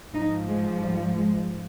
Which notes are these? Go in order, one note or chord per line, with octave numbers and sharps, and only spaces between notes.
G#2 F3 D#4
G#3
G3
G#3